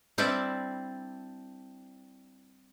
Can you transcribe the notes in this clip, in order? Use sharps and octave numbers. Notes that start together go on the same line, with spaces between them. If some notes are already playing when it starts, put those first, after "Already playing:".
G3 C4 D4 E4 A4